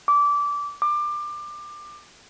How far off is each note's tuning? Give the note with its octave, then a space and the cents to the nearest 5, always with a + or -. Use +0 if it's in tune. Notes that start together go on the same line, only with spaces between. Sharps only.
D6 -20
D6 +25